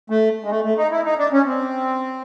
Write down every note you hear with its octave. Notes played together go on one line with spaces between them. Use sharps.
A3
G#3
A3
A3
D#4
E4
D#4
D4
C#4
C4